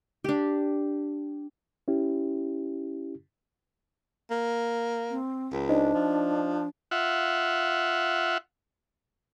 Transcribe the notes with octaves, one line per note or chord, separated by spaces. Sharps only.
D4 G4
C#4 E4 G4
A#3
C4
C#2
D4 D#4 C5 D#5
F3
F4 E5 F#5